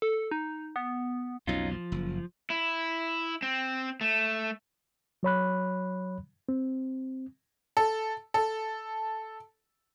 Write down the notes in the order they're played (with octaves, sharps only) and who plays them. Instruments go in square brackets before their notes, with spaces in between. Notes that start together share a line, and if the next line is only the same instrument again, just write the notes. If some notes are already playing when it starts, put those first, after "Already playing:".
[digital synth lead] A4
D#4
B3
[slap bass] B1 F2 [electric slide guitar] C#4 D#4 F4
[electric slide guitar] F3
[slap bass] F#1
[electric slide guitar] E4
C4
A3
[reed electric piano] F#3 C#5 B5 F#6
C4
[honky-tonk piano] A4
A4